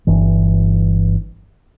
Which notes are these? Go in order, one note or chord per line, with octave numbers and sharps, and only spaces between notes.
G1 G2 E3